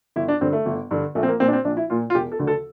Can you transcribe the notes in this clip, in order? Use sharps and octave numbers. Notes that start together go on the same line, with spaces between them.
G1 E4
D4
G2 D3 C4
A3
G1
G2 D3
A#1 A3
C4
A#3
A#2 C4
D4
C4
A#1 D4
E4
A#2 F4
F4
E1 G4
A4
D2 D3
A4